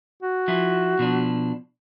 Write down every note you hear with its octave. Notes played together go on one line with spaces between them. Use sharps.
F#4
F3 E4
B2 F3 D4